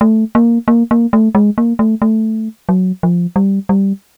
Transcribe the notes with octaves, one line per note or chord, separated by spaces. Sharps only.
A3
A#3
A#3
A#3
A3
G#3
A#3
A3
A3
F#3
F3
G3
G3